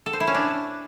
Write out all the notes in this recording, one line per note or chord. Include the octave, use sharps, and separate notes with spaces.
A4
C5
E4
C#4
D4